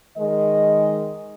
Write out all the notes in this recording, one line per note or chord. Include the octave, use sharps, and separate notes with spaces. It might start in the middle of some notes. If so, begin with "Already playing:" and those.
D#3 G#3 D#5